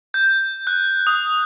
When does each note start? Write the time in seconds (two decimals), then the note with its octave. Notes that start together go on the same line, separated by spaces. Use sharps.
0.14 G6
0.67 F#6
1.07 D#6